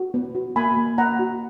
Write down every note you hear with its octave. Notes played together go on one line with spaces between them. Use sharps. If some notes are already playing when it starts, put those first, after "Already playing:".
Already playing: F#4
B3
F#4
A#3 G#5 B5
A#3
A#3 F#5 A#5
F#4